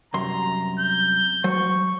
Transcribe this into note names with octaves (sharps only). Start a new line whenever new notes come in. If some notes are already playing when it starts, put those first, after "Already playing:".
C2 F#2 A#5 C6
G6
F#3 C5 C#6